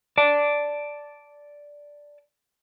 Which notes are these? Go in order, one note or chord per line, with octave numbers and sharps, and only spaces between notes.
D5 A5